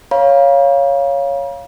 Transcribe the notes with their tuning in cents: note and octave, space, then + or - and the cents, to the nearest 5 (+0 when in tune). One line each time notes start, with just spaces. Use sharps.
C#5 +0 F5 +0 A#5 +45